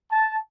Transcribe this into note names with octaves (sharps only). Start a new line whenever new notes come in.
A5